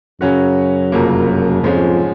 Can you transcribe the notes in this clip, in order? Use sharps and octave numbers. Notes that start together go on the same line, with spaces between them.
F#2 C#3 F#3 C#4 F#4
F1 F2 C#3 F#3 A#3
F2 G#2 F3 G#3 C#4